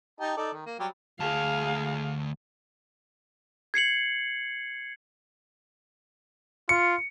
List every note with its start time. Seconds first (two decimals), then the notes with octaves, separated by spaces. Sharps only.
0.20 D#4 G4 A5
0.37 D#4 A4 D5
0.52 D#3
0.66 A#3
0.80 F#3 G3 G5
1.20 D2 G#4 F5 A5
3.74 G#6 C7 C#7 F#7
6.69 F4 C#7